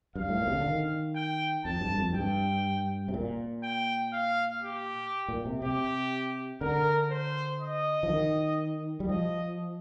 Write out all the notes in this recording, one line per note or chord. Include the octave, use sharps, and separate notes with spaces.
G2 F5
A2
A#2
C3
D3
D#3
G5
F2 A5
G2
F2
G2 G5
C3
A#2
G5
F5
G4
A#2
C3
C3 G4
D3 A#4
C5
D#5
F3
D#3
G3
F3 D#5